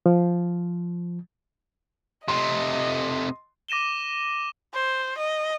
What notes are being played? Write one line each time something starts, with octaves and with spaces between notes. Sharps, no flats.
F3
C3 A3 D#5 C6
D6 A#6 D#7 E7 G7
C5
D#5